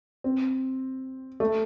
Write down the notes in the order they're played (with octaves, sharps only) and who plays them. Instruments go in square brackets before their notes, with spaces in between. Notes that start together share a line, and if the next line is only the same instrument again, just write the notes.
[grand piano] C4
A3